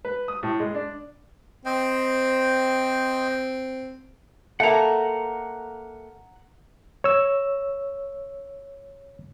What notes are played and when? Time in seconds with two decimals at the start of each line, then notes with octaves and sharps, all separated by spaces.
0.05 B4
0.28 D#6
0.43 A2
0.60 G#3
0.75 D4
1.65 C4 C5 D#5 G5
4.60 A3 A#3 F#5 A#5
7.04 C#5 E6